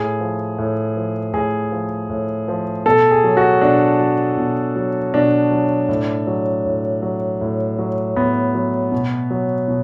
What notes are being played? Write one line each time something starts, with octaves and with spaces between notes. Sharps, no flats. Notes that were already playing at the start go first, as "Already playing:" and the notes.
Already playing: A2 G#4
F3
A2
F3
A2 G#4
F3
A2
F3
B2 A4
G#4
F#3
F#4
B2 D4
F#3
B2
F#3
B2 D4
F#3
A2
F#3
A2
F#3
A2
F#3
A2 B3
F#3
B2
F#3
B2